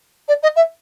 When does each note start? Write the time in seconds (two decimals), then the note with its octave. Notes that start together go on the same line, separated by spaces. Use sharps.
0.28 D5
0.43 D#5
0.56 E5